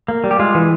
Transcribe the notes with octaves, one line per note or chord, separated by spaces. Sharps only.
A#3
G3
G4
G#3 F4
E3